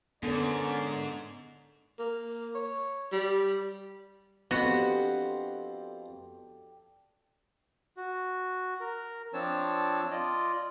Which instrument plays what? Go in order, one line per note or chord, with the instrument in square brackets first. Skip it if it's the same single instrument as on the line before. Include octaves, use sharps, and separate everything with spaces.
[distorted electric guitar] G#2 [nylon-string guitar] D3 [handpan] B3 D4 [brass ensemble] C#4 A#4 D5
[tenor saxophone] A#3
C#5
G3
[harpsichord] F2 C4 [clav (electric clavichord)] B3 [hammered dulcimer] D4 G4 A4 [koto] F#4
[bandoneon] F#4
A#4
F3 C4 D4 C#5 A5 E6
F4 D5 D#5